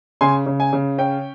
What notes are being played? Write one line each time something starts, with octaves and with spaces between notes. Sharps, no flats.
C#3 G#5 C6
C#3
G#5
C#3
C#4 G5